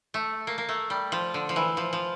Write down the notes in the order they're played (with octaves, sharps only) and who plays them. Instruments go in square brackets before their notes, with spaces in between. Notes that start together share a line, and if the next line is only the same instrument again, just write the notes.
[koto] A3
A#3
A#3
A3
G3
F3
D3
F3
E3
F3
F3